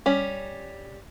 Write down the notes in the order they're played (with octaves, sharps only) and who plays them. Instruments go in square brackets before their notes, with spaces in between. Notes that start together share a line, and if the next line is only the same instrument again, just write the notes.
[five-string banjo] G3 C#4